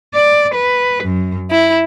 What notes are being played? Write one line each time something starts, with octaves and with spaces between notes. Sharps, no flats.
D5
B4
F#2
E4